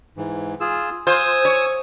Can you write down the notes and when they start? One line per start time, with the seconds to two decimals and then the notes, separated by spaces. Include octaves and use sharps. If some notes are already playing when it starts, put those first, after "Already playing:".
0.17 G#2 E3
0.60 F4 G#4 E6
1.07 F4 C5 G#5 D#6 E6
1.45 C#5